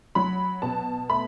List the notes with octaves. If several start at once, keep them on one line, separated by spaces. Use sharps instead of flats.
F#3 B5
B2 A5
A3 B5